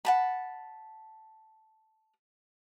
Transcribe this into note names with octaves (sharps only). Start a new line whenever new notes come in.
F#5 A5 B5